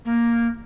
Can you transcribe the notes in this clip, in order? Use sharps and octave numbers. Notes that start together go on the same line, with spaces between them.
A#3